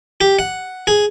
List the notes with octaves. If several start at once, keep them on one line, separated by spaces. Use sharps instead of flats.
G4
F#5
G#4